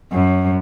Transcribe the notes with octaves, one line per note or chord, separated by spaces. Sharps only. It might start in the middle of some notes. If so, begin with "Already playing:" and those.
F#2